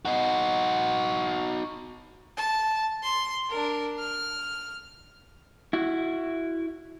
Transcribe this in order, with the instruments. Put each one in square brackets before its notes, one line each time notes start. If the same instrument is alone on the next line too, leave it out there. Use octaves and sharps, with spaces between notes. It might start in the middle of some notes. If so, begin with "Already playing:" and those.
[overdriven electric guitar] D#4 F#4
[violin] A5
C6
D4 A#4
F6
[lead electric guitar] E4 F#4